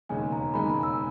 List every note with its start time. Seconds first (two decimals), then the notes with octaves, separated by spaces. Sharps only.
0.09 E1 D#2 C#3 G#3 D#4 G#5
0.32 A#5
0.54 E1 D#2 C#3 G#3 D#4 B5
0.70 B5
0.83 E6